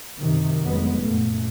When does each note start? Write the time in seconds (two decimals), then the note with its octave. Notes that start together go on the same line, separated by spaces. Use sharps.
0.19 F#2 C3 D#3
0.64 F1 F2 F#3 G#3 B3
1.01 F#2 A#2 A3